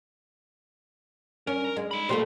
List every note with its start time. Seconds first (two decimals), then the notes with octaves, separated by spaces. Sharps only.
1.47 C#4 A#4
1.77 G#3
1.91 D#4 B5
2.09 A#2 A3 A#3 G4 C5